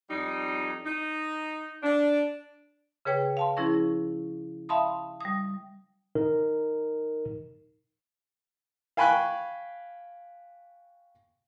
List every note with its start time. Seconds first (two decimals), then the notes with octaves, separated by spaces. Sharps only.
0.10 F2 G3 D#4
0.86 D#4
1.82 D4
3.05 C#3 G#4 B4 C#5 G5
3.37 F5 A5 C6
3.57 F3 C#4 E4 G#4 C#6 A#6
4.69 E5 F5 A5 B5 C6 D#6
5.20 G3 D#6
6.15 D#4 A#4
8.97 F5 G5 G#5 B5 C#6 F#6